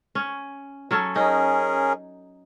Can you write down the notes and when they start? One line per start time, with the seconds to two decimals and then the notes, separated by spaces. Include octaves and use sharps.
0.15 C#4
0.91 F#3 C#4 A4
1.16 C#4 D#4 G#4 A#4